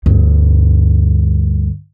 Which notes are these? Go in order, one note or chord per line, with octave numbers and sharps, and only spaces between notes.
D2 G2